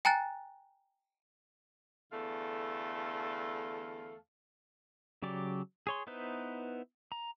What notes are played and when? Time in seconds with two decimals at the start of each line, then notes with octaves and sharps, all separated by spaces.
0.05 G5 G#5 A#5 F#6 A6
2.12 E2 D3 A3 A4 F5
5.22 C#3 F#3 G4 D5
5.87 G#4 C#5 C6
6.07 B3 D#4 E4 B4 C5
7.12 A#5